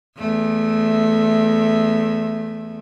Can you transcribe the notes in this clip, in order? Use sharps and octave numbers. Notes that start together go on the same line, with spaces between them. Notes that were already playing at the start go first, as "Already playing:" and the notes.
E2 A3